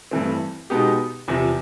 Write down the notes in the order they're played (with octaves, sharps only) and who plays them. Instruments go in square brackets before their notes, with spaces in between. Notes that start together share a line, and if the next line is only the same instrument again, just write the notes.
[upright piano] G2 E3 A3 C4
B2 G#3 B3 D#4 G4
E2 C3 F3